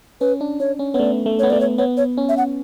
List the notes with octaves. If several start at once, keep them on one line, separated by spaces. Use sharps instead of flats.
C#4 B4
D4
D4 C#5
C#4
B3 C#5
A3 D5
A3
B3 C#5
A3 D5
C#5
B3 C#5
C#5
C#4
E5
F#5